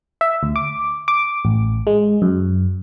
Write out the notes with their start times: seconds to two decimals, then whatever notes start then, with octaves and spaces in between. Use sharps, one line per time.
0.21 E5
0.43 D2
0.56 D6
1.08 D6
1.45 A1
1.87 G#3
2.22 F#2